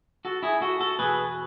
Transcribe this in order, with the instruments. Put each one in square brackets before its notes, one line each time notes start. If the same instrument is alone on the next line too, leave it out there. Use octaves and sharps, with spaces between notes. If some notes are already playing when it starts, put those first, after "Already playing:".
[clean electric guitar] F#4 A4
E4 G#4
F#4 A4
F#4 A4
E2 B2 G#4 B4